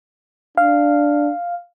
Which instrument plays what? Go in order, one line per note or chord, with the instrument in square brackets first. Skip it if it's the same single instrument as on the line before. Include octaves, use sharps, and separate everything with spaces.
[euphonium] D4 [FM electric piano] F5